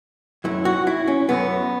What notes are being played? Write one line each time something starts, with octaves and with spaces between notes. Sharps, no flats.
F#2 F#3 A3 E4
F#4
E4
C#4
F#2 F#3 A3 B3